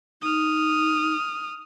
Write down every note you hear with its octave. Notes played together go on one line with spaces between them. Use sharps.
D#4 D#6 F6